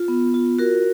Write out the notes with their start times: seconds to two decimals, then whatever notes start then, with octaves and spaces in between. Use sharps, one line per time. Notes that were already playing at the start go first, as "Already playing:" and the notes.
Already playing: F4
0.08 B3
0.34 F4
0.58 F#4 A#4